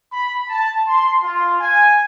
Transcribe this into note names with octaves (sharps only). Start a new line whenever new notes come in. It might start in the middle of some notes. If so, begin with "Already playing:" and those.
B5
A5
C6
F4
G#5